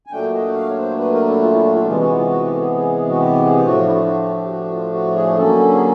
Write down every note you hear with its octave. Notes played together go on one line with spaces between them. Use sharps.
G#5
A#2 F#3 A3 D4 G5
D#5
F#5
F5
C#5
C5
B4
A#4
E4
F4
E4
F4
F4
C3 E3 G#3 B3 F4
F#4
E4
F4
F#4
G4
A4
G#4
G#4
F#4
G4
G#4
G4
A2 F3 A3 D4 F#4
F4
E4
F4
F#4
G4
G4
G4
F#4
F#4
F4
F#4
G#4
D3 F#3 A#3 C#4 A4
G#4